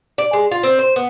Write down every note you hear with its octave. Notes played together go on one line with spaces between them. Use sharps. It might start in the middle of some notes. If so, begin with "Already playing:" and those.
D5
G#3
F4
C4
C5
B3